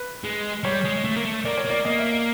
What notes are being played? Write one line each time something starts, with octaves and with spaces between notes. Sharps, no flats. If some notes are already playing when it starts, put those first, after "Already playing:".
Already playing: B4
G#3
G3 C#5
G#3
G#3
A3
A#3
A3
A#3 D5
C#5
A#3 D5
A#3 D#5
E5
E5